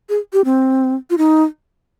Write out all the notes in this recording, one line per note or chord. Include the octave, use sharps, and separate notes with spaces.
G#4
G4
C4
F4
D#4